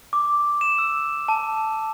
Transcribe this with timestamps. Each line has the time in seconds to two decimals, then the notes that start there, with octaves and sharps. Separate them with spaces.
0.13 D6
0.61 E7
0.78 E6
1.28 A5